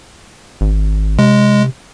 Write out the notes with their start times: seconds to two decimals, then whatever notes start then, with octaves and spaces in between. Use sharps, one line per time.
0.61 G#1
1.19 C3 G#3